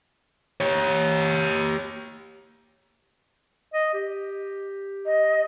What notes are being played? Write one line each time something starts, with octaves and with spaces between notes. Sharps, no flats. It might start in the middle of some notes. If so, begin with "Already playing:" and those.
G4 C#5
D#5
G4
D#5